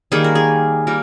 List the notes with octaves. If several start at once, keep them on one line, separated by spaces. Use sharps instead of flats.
D#3 G3 A#3 G#4
A#4
G#4
G3 A#3 A#4